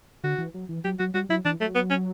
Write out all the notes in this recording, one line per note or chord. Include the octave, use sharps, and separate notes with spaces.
D3 F#4
E3
F#3
E3
F#3 G4
F#3 F#4
G3 F#4
F#3 E4
E3 D4
F#3 A3
B3
C#4